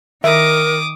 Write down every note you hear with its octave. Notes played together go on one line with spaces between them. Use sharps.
D#3 A#4 E5 D6 D#6